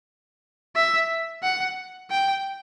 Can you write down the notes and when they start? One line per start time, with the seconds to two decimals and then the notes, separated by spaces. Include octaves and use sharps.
0.76 E5
1.43 F#5
2.10 G5